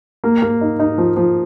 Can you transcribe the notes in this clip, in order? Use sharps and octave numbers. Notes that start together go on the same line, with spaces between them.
A#3
A#3
D#4
D#4
F3
F3